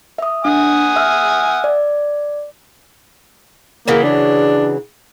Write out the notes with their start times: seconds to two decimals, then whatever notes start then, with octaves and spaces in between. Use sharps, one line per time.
0.18 E5 D#6
0.45 D4 F#5 G#5 D#6
0.96 E5 E6 F6
1.64 D5
3.88 C#3 E3 F#3 A#3
4.04 D4